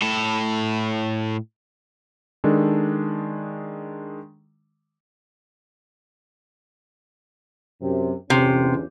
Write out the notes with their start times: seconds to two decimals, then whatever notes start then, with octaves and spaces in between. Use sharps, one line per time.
0.02 A2 A4
2.44 D#3 G#3 D4 A4
7.81 F#2 C3
8.30 G1 E2 C3 C#4